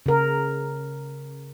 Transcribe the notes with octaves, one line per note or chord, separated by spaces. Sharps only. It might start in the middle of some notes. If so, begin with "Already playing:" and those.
C#3 A#4